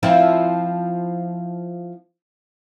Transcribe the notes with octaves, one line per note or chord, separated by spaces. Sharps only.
F3 C4 E4